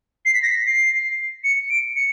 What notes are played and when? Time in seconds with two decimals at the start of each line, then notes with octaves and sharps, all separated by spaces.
0.26 C7
0.35 B6
0.42 A#6
0.50 B6
0.66 C7
1.44 C#7
1.70 D7
1.96 C#7